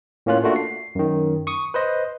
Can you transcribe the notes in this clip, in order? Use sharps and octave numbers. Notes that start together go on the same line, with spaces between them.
A2 A#3 C#4 F4 F#6
A3 A#3 D4 F4 F#4
C7
F#2 D#3
C#6 D#6
B4 C5 D#5